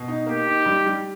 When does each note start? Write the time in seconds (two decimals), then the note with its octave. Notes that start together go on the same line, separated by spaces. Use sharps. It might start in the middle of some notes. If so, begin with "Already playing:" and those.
Already playing: B2
0.08 D#4
0.27 A#3 G4
0.47 D#4
0.66 G3
0.86 G3